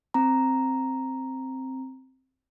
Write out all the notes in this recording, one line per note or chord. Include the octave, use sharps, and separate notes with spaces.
C4 A#5